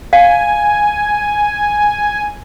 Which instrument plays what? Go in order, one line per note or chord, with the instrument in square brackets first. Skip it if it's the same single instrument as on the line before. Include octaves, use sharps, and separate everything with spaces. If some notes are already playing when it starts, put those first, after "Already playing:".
[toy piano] F5 [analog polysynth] G#5